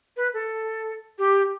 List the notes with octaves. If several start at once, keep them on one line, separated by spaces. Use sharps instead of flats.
B4
A4
G4